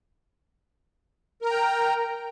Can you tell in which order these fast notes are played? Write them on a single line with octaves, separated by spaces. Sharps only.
A#4 A#5 G5